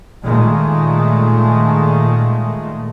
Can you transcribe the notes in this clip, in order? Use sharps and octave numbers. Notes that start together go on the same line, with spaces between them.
A#2 D#3 G#3 A3